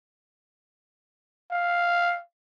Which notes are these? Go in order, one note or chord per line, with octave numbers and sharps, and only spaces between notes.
F5